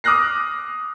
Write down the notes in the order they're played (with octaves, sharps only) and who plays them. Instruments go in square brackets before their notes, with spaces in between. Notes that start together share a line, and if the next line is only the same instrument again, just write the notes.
[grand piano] D6 D#6 F6 F#6 A#6 C7